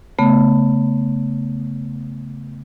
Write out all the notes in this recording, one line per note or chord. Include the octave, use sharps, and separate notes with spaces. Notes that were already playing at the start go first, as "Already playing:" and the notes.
C#3 A3 B3